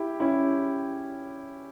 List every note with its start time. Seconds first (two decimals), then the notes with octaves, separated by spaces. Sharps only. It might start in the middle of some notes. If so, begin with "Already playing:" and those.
Already playing: E4 G4
0.20 C#4 E4